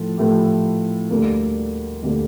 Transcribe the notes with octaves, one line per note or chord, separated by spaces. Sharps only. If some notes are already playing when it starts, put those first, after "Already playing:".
Already playing: A2 F3 A3
A2 F3 A3 E4 G4
D2 D3 G3 A#3
D2 D3 G3 A#3